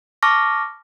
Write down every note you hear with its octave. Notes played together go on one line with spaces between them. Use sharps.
A5 C#6 D6 F6 A#6